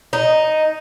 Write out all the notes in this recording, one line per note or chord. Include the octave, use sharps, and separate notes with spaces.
D#4